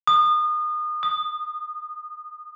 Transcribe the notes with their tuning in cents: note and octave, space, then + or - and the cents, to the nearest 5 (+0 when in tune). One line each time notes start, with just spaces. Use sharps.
D#6 -30
D#6 -10